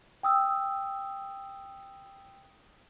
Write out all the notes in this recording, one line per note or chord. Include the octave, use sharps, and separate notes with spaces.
G5 D#6 E6